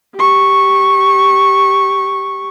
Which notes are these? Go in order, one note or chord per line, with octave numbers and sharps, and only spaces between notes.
G4 C#6